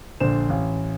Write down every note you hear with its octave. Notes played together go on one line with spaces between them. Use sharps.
A#1 D3 C5 E7
A1 F5